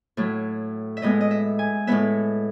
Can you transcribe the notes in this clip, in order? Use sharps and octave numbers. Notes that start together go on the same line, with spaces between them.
A2 F#3 A3
E5
A2 G#3 B3 D#5
D#5
E5
G#5
A2 G#3 B3 E5